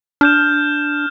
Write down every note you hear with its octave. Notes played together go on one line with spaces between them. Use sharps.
D4 F6 G6 E7